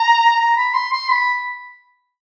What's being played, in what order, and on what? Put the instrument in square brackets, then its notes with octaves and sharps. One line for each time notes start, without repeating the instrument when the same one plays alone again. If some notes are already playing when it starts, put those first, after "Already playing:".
Already playing: [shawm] A#5
A#5
B5
C6
C6
B5